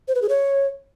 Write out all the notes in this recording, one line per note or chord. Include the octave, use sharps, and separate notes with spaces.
C5
B4
G#4
C#5